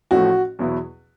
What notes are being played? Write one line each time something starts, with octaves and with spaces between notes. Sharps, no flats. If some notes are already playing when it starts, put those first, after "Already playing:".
A1 A2 F3 A3 F#4
E2 B2 F#3 B3 E4